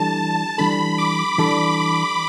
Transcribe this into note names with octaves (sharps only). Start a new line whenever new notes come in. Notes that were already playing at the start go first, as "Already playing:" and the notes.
Already playing: E3 G3 D4 A4 A5
E3 G3 D4 A4 B5
D6
E3 G3 D4 A4 B5